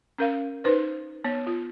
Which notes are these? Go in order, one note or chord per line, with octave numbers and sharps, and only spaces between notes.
C#4 A#4 F5
D#4 B4 C5
B3 C#5
F4